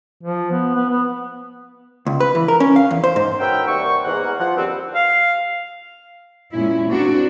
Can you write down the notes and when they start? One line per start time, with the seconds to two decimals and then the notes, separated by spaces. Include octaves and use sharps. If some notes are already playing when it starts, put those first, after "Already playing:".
0.23 F3
0.51 B3
0.75 B3
0.89 B3
2.06 C#2
2.20 B4
2.35 E3
2.48 A#4
2.60 C#4
2.76 F5
2.91 E2
3.04 C5
3.16 G#2
3.40 F#4 A#4 B4 C#5 E5 G5
3.68 D#2 C3 G3 F#5 C#6
4.05 E2 G#2 A#3 F#5
4.39 F3 F#5
4.56 D#2 D3 G3 B3 C4
4.95 F5
6.53 A#2 G#3 C#4 E4
6.90 A#3 C4 D4 F#4